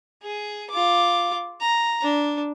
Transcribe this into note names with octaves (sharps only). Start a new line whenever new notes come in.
G#4
F4 D6
A#5
D4